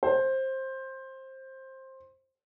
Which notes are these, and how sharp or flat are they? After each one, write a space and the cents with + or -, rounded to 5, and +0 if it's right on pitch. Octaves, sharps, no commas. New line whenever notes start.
C5 +15